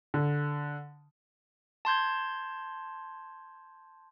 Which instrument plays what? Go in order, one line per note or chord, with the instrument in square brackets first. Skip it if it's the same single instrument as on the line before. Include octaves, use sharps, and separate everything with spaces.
[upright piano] D3
[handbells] A5 C6 G6 G#6